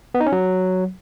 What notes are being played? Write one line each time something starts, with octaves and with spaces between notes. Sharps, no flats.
B3
D#4
C#4
F#3